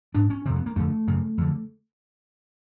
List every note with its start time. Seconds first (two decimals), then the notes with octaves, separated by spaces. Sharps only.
0.14 G#2 D4
0.30 C#4
0.45 C3 C4
0.49 F2
0.55 B3
0.66 A#3
0.76 F2 D3 A3
1.07 F#2 C#3
1.38 F2 D3